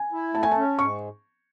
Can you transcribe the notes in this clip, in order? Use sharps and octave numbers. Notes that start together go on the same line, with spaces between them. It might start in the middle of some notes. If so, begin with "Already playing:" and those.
Already playing: G#5
E4
A3 A5
G#5
A5
C#4
G#2 C#6